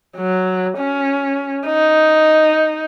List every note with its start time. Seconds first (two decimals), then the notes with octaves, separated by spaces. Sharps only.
0.17 F#3
0.78 C#4
1.66 D#4